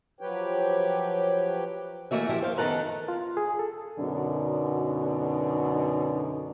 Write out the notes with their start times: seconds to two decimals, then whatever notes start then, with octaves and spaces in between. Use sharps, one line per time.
0.20 F3 F#3 G4 B4 C#5 G5
2.11 E3 F3 A3 A#3 F#4 E5
2.29 F3 E4 G4
2.42 C5 F5
2.58 F#2 D#3 B3 A4 F#5 A#5
3.08 F4
3.37 G#4
3.59 A4
3.99 F#2 B2 D3 D4 D#4